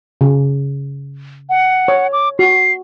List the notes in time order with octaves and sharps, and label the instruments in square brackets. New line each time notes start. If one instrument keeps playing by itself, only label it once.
[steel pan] C#3
[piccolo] F#5
[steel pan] C#5
[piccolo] D6
[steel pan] F#4 [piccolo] C7